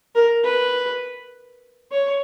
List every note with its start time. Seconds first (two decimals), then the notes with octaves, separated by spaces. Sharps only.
0.15 A#4
0.44 B4
1.91 C#5